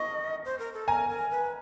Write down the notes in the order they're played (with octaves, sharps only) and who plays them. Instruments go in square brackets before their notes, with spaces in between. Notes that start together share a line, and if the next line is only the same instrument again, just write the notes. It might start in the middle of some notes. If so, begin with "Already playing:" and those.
Already playing: [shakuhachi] D#5 [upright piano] C#6
[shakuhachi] C5
A#4
A4
[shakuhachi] A#4 [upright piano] G#5 A#5
[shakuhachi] A#4
B4